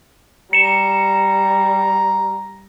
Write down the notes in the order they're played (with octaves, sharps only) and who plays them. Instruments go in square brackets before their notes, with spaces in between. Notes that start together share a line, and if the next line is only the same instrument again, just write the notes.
[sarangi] G3 [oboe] A#5 [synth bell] C#7 E7